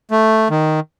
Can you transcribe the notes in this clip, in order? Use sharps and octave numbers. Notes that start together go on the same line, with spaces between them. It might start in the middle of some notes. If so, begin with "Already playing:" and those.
A3
D#3